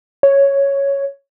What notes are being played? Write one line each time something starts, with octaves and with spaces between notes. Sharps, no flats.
C#5